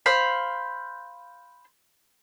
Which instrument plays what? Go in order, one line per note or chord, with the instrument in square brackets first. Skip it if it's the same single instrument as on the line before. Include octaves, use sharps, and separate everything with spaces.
[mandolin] C5 F5 B5